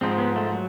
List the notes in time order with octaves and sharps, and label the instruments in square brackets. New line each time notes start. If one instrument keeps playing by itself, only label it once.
[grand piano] G#2 F3 G#3 [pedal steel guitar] C4
[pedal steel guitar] B3
A3
F#3